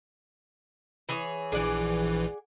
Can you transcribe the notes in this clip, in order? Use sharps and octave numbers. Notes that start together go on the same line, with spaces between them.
E3 G#4 C#5
A#1 E3 G#4 D5 F#5